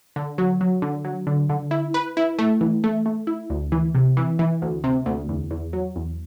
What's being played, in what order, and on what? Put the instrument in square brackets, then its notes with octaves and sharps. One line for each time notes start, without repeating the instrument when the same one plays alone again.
[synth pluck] D3
F#3
F#3
D3
F#3
D3
D3
E4
B4
E4
A3
E3
A3
A3
E4
D2
E3
C3
E3
E3
D2
C3
D2
E2
E2
F#3
E2